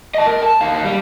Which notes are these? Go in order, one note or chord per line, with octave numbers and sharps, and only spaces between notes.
D#5 A5
A#4
A5
D#2 F5
G3